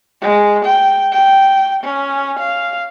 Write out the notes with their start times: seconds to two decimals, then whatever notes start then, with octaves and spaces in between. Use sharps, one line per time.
0.22 G#3
0.65 G5
1.13 G5
1.84 C#4
2.39 F5